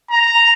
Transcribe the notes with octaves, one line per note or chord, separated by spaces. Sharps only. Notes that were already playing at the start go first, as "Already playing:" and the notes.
A#5